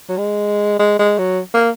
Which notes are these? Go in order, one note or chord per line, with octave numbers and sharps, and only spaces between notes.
F#3
G#3
G#3
G#3
F#3
A#3